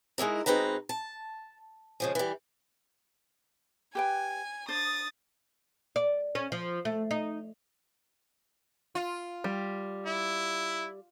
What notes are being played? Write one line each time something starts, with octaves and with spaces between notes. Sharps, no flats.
G#3 D#4 E4 A#4
B2 G#3 C4 D#4 B4 A#5
A5
C#3 F3 G#3
E3 G3
G4 B4 G5 G#5
D4 C5 D#6 A6
D5
C#4
F3
A3
D#4
F4
G3
E4